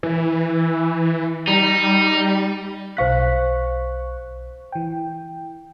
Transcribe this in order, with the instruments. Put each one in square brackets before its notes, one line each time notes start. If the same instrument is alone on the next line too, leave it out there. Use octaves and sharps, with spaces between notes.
[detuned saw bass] E3
[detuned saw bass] G3 [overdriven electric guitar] D#4
[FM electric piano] B1 C#6 F#6 [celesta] C5 F5 B6
[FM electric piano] E3 G5